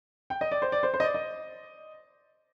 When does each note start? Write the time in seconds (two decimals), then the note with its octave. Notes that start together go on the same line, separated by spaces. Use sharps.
0.30 G5
0.41 D#5
0.51 D5
0.62 C5
0.72 D5
0.83 C5
0.94 C5
1.00 D#5
1.04 D5
1.14 D#5